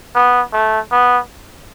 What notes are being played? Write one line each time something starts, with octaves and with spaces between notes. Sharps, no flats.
B3
A3
B3